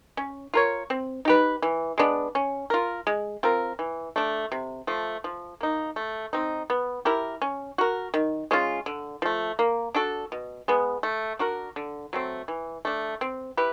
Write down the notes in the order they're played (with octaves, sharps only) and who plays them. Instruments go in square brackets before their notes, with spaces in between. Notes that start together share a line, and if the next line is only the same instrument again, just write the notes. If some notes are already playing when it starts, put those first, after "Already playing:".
[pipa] C#4
F4 A#4 C#5
C4
D#4 G4 B4
E3
G#3 B3 D4
C#4
F4 A#4
G#3
C4 F4 A#4
E3
A3 D4
C3
F3 A3
F3
A#3 D#4
A3
C4 D#4
B3
E4 G4 A#4
C#4
F#4 A#4
D#3
G#3 C#4 F4
D3
F3 A3
A#3
D4 F#4 A4
B2
G#3 B3
A3
D4 F#4 A#4
D3
F#3 A3 C4
E3
A3 D4
C4
E4 G4 B4